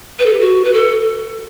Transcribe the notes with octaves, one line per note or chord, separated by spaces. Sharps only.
B4
A4
G4
F#4
B4
A4